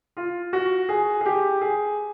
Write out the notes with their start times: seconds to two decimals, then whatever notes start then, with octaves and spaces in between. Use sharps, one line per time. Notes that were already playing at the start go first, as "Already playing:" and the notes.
0.17 F4
0.53 F#4
0.89 G#4
1.21 G#4
1.26 G4
1.61 G#4